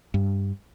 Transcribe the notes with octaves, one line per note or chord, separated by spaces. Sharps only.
G2